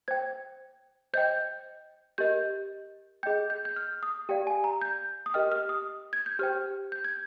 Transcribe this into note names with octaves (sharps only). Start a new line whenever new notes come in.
C5 G5 G#6
C5 D#5 G5 G6
G4 A#4 D#5 G6
G#4 D#5 G5 G6
G6
G6
F6
D#6
G4 D5 F5 G5
G#5
A#5
G6
D#6
G4 A#4 D#5 G5 F6
F6
D#6
G#6
G6
G4 C5 G5 F6
G6
G#6